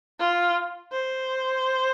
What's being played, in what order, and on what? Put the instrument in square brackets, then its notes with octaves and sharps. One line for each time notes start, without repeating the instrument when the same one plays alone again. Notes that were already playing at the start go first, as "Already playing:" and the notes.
[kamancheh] F4
C5